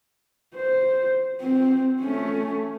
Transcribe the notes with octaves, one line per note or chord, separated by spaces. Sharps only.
C5
C4
A3 C#4